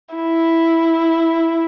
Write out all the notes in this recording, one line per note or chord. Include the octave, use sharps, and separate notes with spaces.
E4